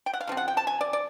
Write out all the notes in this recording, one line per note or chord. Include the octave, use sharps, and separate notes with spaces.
G5
F#5
F5
C#3 F3 C4
F#5
G5
A5
G#5
D5
D5